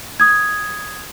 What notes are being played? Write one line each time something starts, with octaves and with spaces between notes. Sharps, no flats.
D#6 G#6